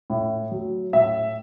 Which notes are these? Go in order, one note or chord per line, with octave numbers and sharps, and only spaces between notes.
A2
F#3
A2 E5